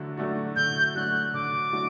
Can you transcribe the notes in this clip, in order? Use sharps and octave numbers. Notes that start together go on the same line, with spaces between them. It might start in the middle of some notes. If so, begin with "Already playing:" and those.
Already playing: D3 F#3 A3 D4 F#4
F#3 A3 D4 F#4
D3 G6
F#3 A3 D4 F#4 F#6
D3 D6
F#3 A3 D4 F#4